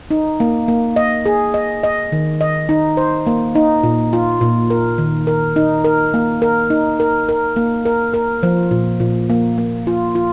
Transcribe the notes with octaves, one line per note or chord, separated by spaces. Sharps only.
D#4
A#3
A#3
D#5
G#4
D#5
D#5
D#3
D#5
D#4
C5
A#3
D#4
A#2
F4
A#2
A#4
D#3
A#4
D#4
A#4
A#3
A#4
D#4
A#4
A#4
A#3
A#4
A#4
F3
A#2
A#2
A#3
A#3
F4
F4